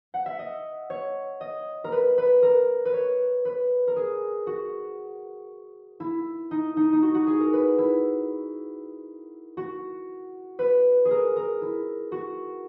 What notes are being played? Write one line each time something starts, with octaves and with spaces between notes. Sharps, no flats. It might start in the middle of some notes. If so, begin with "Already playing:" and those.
F#5
E5
D#5
C#5
D#5
A#4
B4
B4
A#4
B4
C#5
B4
A#4
G#4
F#4
E4
D#4
D#4
D#4
F#4
F#4
G#4
A#4
B4
E4
F#4
B4
G#4
A#4
A#4
E4
F#4